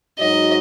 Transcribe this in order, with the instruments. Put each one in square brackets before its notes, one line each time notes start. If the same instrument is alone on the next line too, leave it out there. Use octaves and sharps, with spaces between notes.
[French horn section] G#2 F#3 D#4 F#4 C#5 [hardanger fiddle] D#5